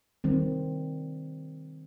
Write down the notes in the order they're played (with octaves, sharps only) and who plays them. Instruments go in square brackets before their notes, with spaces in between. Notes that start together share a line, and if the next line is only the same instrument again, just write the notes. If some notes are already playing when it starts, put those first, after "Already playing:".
[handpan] D#3 G3 C4